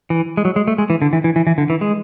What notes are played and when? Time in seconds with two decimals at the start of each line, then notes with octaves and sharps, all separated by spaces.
0.10 E3
0.37 G#3
0.45 F#3
0.56 G#3
0.68 A3
0.78 G#3
0.90 E3
1.02 D3
1.13 E3
1.24 E3
1.36 E3
1.47 E3
1.58 D3
1.70 E3
1.81 G#3